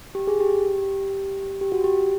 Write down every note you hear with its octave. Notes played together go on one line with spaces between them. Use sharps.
G4
G#4
G4
G4
F#4
G4